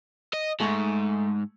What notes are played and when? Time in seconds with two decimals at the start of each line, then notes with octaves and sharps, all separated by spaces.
0.33 D#5
0.60 G#2 G#3 A3 C#6